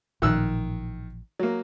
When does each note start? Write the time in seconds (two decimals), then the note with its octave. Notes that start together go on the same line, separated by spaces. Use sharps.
0.22 A1 A#2 D#3 F3 E6 F#6
1.39 F#3 A#3